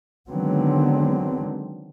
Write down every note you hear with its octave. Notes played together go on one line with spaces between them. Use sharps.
D3 D#3 F#3 G#3 B3 C4